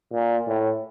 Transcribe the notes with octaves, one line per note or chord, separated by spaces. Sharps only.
A#2
A2